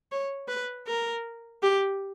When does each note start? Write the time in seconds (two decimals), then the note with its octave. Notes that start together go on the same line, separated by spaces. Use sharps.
0.12 C#5
0.48 B4
0.87 A#4
1.62 G4